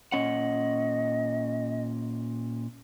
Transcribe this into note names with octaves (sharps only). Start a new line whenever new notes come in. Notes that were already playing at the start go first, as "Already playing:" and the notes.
A#2 C#4 D#5 F#5